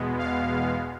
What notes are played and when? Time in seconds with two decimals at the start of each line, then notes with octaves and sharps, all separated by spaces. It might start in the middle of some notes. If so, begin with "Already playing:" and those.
Already playing: E2 B2 G#3 B3
0.18 F5